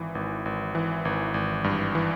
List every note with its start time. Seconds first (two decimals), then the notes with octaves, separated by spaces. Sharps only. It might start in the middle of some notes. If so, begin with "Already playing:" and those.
Already playing: G#1 E3
0.15 G#1
0.46 G#1
0.75 E3
1.05 G#1
1.34 G#1
1.64 G2
1.95 E3